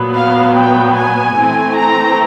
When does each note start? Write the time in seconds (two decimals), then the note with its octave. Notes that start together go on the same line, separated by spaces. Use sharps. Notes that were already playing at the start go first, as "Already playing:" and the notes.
Already playing: A#2 F#3 B3
0.14 F5
0.55 G5
0.95 G#5
1.36 E3 A3 C4
1.77 A#5